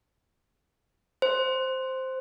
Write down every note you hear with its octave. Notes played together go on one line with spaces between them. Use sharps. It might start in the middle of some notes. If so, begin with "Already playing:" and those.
C5